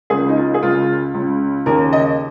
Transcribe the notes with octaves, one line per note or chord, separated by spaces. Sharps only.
C#2 C#3 G#4
D#4
F4
G#4
C#2 C#3 F4
C#2 C#3
D#2 C#3 A#4
D#5